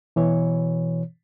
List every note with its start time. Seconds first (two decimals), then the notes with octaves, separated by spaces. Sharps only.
0.16 B2 E3 C#5